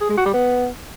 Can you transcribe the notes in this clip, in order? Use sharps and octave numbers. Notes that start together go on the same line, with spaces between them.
G#4
G#3
F#4
G3
B3